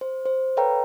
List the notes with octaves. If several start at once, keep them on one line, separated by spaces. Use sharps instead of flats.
C5
C5
A4 B4 C#5 F5 G5 A#5